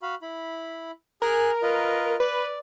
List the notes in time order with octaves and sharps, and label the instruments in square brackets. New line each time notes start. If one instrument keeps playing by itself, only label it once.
[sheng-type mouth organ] F#4 F5 B5
E4 B5
[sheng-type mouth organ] G#4 G#5 F#6 [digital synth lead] A#4
[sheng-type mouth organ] F4 B4 D#5
[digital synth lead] B4 [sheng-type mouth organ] D5